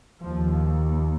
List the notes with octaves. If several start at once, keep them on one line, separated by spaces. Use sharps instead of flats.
D#2 F3